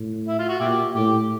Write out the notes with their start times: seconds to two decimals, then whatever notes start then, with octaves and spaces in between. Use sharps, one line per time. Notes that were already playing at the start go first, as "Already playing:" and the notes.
Already playing: A2
0.28 E4
0.39 F4
0.49 F#4
0.60 A#2 E4 G4
0.95 A2 G4